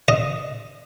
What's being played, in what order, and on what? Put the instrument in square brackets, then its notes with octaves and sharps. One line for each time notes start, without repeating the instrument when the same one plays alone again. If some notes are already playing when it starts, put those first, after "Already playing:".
[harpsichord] D#5